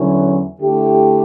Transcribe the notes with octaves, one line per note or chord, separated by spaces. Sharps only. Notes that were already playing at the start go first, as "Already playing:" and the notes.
Already playing: E2 D3 F#3 C#4 E4
D3 A3 E4 G4